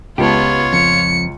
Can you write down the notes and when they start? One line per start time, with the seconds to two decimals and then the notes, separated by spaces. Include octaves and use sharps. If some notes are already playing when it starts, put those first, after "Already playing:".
0.18 C#2 B3 F4 G4 C#5 A5
0.73 F2 C#7